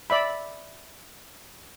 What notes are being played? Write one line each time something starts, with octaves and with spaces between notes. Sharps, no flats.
D5 E5 B5